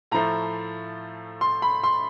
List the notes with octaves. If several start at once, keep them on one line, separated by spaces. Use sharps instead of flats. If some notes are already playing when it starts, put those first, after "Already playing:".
A2 F3 A3 A#5
C6
B5
C6